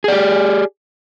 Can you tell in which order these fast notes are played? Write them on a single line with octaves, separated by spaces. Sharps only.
G#4 D5 G4